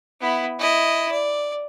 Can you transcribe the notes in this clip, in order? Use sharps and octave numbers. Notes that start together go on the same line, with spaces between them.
B3 E4
E4 D#5
D5